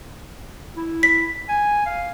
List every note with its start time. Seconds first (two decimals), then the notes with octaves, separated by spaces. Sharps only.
0.77 E4
1.03 B6
1.49 G#5
1.86 F5